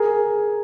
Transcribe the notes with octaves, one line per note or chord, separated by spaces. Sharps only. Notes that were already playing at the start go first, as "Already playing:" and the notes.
Already playing: G#4 A#4